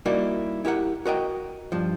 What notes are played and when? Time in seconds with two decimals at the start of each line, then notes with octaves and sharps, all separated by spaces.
0.06 G3 A#3 D#4 E4 F#4
0.65 E4 G4 A#4 F#5
1.06 F#4 A#4 D#5 G5
1.72 G2 F3